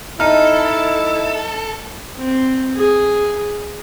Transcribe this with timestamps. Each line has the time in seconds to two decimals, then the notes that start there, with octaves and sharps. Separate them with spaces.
0.20 D#4 E4 A4 D#5 E5 F6
2.18 C4
2.76 G#4